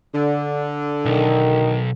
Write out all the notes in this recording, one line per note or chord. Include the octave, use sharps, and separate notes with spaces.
D3
B1 D#3